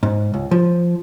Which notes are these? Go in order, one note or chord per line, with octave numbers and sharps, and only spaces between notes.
G#2
C#2
F3